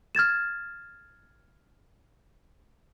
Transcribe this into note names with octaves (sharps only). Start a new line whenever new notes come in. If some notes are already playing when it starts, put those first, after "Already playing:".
F6 G#6 A6 E7